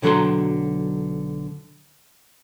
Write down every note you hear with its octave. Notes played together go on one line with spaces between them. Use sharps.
B1 D3 F#3 A4 A#5 C6